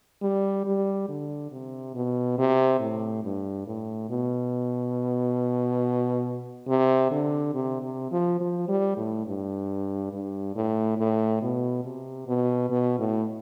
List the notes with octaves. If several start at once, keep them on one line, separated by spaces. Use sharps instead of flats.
G3
G3
D3
C3
B2
C3
A2
G2
A2
B2
C3
D3
C3
C3
F3
F3
G3
A2
G2
G2
A2
A2
B2
C3
B2
B2
A2